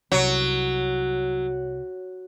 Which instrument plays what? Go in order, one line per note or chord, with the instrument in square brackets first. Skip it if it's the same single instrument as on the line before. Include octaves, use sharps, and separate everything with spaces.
[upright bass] C2 [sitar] F#3